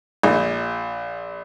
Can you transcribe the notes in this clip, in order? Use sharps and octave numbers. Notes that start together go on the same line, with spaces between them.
A#1